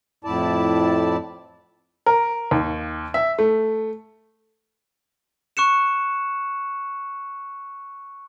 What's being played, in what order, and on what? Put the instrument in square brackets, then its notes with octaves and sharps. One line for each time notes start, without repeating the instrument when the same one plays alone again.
[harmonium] F2 A2 E4 D5 A5
[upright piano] A#4
D#2
E5
A3
[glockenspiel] C#6 F#6 C#7 E7